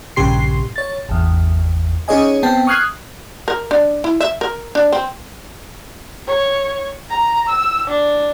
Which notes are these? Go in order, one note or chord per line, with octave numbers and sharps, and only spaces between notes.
A#1 G2 C#3 G4 C6 C7
C#5 A6
G#1 E2
C#4 D#4 G#4 C#5 D#5 G#5
B3 C4 G5 A5
C#6 D#6 F6 F#6 G#6 C7
A#4
D4
E4
E5
A#4
D4
C4
C#5
A#5
E6
D4